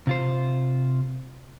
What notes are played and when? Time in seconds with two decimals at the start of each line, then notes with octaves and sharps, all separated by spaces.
0.07 C3 F4 C5